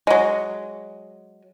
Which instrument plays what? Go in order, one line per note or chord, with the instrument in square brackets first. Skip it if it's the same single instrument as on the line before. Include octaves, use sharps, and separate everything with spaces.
[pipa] F#3 G#3